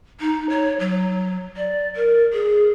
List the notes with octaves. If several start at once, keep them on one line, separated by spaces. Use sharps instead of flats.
D#4
C#5
F#3
D5
A#4
G#4